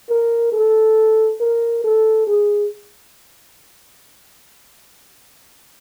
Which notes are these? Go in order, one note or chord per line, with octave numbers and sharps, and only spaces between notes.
A#4
A4
A#4
A4
G#4